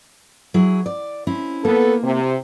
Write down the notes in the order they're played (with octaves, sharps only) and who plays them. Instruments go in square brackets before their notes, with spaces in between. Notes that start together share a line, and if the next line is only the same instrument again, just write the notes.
[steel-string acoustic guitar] F#3 E4 G#4
D5
C4 C#4 E4
[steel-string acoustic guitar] A#3 [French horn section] B3 A4
[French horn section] C3